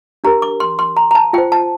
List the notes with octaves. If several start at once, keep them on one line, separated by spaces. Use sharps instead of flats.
D4 G4 A#4 A#5
D6
C6
C6
A#5
A#5
A5
F4 C5 G5
A5